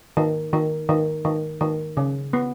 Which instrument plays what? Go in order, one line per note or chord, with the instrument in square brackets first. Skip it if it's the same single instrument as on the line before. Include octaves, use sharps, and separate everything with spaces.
[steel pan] D#3
D#3
D#3
D#3
D#3
C#3
B3